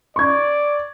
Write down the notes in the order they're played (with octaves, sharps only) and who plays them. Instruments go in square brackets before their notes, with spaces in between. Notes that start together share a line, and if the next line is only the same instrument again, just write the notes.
[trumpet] D5 [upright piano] C#6 G#6